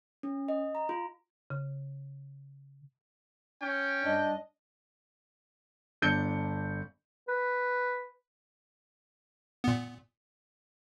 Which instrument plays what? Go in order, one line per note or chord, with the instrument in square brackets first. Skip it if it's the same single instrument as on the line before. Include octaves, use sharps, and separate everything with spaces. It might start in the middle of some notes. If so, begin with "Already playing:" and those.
[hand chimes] C#4
D#5
A#5
F4
[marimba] C#3
[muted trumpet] C#4 [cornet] G5
[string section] G2 D#5 [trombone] D4
[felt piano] G1 D4 G6 C#7
[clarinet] B4
[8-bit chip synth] A#2 B3